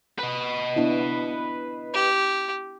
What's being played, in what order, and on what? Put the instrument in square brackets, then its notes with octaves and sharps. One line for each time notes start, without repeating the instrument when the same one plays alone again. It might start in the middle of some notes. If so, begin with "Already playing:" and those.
[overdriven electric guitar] B4 D#5
[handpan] B3 D4 E4
[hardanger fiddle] G4